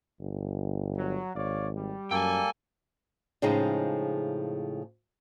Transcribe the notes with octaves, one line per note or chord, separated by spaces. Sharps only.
G1
F#3
G#1 C#5 D5 F5
G3
F#2 A#3 A4 G5 G#5
A2 C#3 F3 G#3 C4 D#4